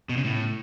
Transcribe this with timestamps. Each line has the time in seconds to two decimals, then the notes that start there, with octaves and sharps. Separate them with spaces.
0.09 B2
0.17 C#3
0.24 A2